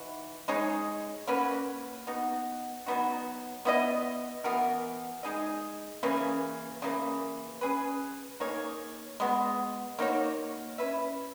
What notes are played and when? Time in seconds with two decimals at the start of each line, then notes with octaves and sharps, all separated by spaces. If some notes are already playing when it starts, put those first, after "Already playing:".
Already playing: E3 D#4 F#4
0.48 G#3 D#4 G#4 C#5
1.27 A#3 C#4 F#4 B4
2.07 B3 D#4 F#4
2.86 F#3 B3 D#4 F#4
3.65 B3 E4 B4 D#5
4.44 E3 B3 F#4 A#4
5.23 G#3 D#4 G#4 D#5
6.03 C#3 E3 A#3 C#4
6.82 C#3 E3 A#3
7.61 C#4 G#4 B4
8.40 A#3 D#4 G#4 C#5
9.20 G#3 B3 F#4
9.99 A#3 D#4 F#4 C#5
10.78 C#4 E4 B4 E5